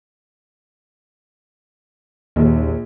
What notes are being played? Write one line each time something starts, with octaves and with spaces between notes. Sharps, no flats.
A#1 D#2